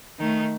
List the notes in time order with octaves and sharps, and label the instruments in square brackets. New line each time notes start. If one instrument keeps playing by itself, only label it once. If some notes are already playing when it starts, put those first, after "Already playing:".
[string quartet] D#3 A3 D#4